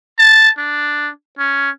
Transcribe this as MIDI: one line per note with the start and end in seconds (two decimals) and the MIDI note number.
0.18 0.50 81
0.58 1.09 62
1.39 1.70 61